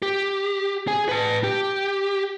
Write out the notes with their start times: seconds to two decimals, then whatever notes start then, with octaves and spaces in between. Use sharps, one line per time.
0.02 G4
0.88 G#4 G#5
1.09 B4 A5
1.44 G4